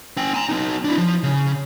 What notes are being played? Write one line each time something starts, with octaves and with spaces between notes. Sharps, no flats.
C#4 G5
G#5 A#5
B3 D#4
D4 E4
F3
C#3